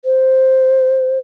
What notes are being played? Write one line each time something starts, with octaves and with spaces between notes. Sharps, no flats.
C5